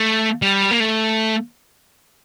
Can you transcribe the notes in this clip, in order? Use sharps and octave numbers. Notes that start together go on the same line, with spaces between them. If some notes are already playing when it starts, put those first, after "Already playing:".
Already playing: A3
G3
A#3
A3